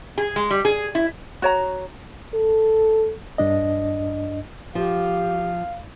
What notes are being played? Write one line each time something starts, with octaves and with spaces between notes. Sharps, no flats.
G#4
G#3
G3
G#4
E4
F#4 C#5 A#5
A4
G2 D4 D#5
F3 G4 F5